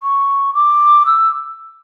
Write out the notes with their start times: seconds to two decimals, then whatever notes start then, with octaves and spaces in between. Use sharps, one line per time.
0.03 C#6
0.54 D6
1.06 E6